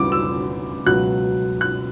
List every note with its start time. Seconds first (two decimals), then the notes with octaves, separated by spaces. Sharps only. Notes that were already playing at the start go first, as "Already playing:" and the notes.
Already playing: D2 C#3 E3 G3 D6
0.12 E6
0.86 C#2 B2 F#3 F#6
1.61 F#6